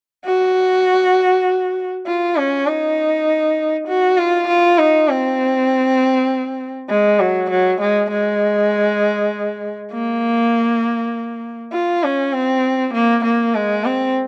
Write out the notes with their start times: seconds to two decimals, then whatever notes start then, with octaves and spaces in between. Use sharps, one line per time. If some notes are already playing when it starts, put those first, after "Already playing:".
0.25 F#4
2.07 F4
2.37 C#4
2.67 D#4
3.88 F#4
4.18 F4
4.48 F4
4.78 D#4
5.09 C4
6.90 G#3
7.20 F#3
7.50 F#3
7.81 G#3
8.10 G#3
9.92 A#3
11.73 F4
12.04 C#4
12.34 C4
12.94 A#3
13.24 A#3
13.55 G#3
13.85 C4